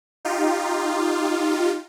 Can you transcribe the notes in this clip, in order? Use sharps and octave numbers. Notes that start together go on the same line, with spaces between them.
D#4 F4 G4